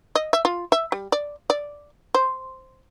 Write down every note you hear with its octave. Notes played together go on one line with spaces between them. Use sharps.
D#5
E5
F4
E5
G3
D5
D5
C5